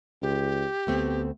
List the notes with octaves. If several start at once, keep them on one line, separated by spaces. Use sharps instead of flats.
C#2 G4
D2 A3 B3 C4